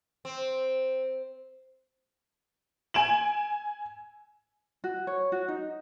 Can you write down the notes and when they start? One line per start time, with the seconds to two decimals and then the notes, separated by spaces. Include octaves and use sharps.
0.25 C4
2.94 G#5 D7 E7 F#7
4.84 F#4
5.07 C#5
5.32 F#4
5.48 D#4